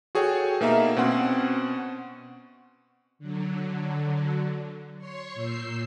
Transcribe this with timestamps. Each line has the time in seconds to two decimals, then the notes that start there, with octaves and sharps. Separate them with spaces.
0.15 F#4 G#4 A4 C#5 G5
0.61 B2 A#3 D#4 E5 F5 A#5
0.96 B2 C4 C#4 F#4 F#5 C6
3.19 D3 F#3
4.98 C#5 C6 C#6
5.35 A#2 E6 G6 C7